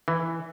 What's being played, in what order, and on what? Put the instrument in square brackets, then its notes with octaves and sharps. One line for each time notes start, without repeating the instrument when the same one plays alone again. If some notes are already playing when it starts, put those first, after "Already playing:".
[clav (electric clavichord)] E3